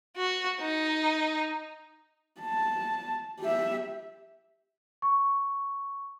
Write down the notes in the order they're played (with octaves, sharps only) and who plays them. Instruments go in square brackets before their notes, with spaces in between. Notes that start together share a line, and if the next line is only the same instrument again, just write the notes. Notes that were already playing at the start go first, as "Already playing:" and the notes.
[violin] F#4
D#4
[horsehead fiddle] A5
G4 E5
[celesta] C#6